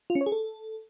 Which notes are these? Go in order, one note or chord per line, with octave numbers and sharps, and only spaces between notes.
F4
C#4
C#5
G#4
A4